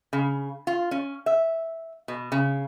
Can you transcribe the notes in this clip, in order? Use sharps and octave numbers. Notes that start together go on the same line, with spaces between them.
C#3
F4
C#4
E5
B2
C#3